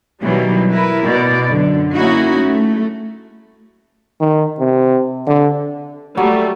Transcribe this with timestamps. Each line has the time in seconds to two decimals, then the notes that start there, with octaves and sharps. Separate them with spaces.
0.21 B2 D#3 E3 F#3 G3
0.70 E4 A#4 B4
1.02 B2 D5
1.49 F#2 D3
1.94 A#3 C#4 D#4 E4 F#4
2.41 A3
4.20 D#3
4.60 C3
5.27 D3
6.17 F#3 G3 A3